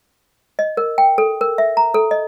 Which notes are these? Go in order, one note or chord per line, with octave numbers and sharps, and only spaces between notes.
D#5
A#4
G5
A4
A#4
E5
A#5
A4
D#5